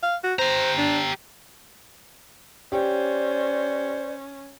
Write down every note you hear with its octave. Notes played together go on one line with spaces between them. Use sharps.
F5
F#4
G4 C5 A#5
D4
C#4 G4 C5 D5